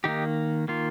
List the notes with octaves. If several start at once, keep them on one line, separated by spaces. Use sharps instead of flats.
D#3 A#3 D#4 G4
D#3 A#3 F4